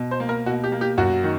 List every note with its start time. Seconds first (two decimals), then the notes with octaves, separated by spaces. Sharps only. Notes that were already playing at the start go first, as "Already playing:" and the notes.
Already playing: B2
0.11 C5
0.20 A#3
0.29 A#4
0.46 B2 F#4
0.64 G4
0.72 A#3
0.81 G4
0.98 F#2 F#4
1.24 D#3